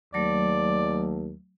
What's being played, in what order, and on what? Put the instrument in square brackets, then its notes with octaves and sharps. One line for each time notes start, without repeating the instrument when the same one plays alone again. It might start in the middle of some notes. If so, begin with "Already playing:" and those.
[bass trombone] D#2 [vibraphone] F#3 A3 [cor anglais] D5